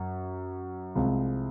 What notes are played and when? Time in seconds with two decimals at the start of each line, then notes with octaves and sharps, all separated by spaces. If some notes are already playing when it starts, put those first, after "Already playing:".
Already playing: F#2
0.95 C2 C3 F3 G#3